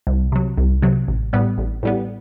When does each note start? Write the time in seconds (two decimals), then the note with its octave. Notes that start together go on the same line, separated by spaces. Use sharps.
0.07 C2
0.32 C3 F#3
0.58 C2
0.82 C3 F#3
1.08 A1
1.33 A2 G3 B3
1.58 A1
1.83 A2 G3 B3